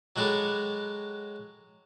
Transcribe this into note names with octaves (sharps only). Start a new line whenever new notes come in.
F#3 G#3 F#4 G4 A4 B5